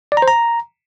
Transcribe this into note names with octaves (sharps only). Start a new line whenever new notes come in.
D5
A#5
C5
A#5